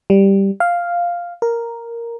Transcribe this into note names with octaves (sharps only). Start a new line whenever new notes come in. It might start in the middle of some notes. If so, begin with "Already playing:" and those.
G3
F5
A#4